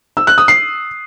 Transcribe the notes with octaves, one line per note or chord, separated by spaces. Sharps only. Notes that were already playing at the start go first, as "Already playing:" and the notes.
E6
F#6
D#6
C7